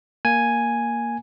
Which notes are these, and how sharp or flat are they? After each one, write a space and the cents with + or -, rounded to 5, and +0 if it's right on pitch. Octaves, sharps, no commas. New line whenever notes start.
A#3 +0 G#5 +0